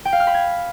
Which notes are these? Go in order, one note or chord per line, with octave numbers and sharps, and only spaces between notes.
G5
F5
F6
B5
G#6